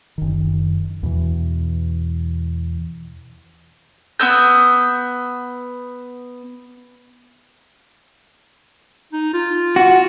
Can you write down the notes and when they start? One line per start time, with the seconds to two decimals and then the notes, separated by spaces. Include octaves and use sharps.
0.18 F#1 D#3
1.03 E2 B2 E3
4.20 B3 E6 G6
9.13 D#4
9.33 F4
9.76 F#4